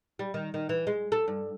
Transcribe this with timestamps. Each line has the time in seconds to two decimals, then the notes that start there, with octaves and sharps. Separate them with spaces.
0.19 G3
0.34 D#3
0.54 D#3
0.69 E3
0.87 G#3
1.12 A4
1.28 G2